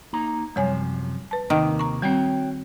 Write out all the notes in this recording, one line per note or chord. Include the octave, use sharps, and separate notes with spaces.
A#3 D#4 A#5
F#2 C3 F3 G3 C#5 G#5
B4 A5
D#2 C3 D#3 A#3
A#5 C#6
G3 C4 F#4 C#5 G5